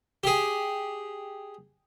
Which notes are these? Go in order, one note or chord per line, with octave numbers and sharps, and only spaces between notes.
G4 G#4